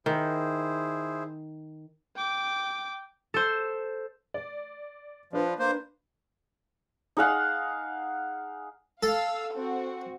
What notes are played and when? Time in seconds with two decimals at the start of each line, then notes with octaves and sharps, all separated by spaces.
0.06 D#3 E4 G#4 C5
2.16 G5 D6
3.34 A4 C5
4.34 D5
5.33 F3 D4 B4
5.59 A#3 C5
7.17 D#4 G#4 F5 F#5
9.03 A4 F5 E6
9.54 C4 F#4